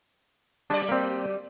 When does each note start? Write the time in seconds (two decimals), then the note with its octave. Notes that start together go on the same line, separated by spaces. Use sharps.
0.70 F#3 G3 D4 D5 A5
0.89 A#3 C4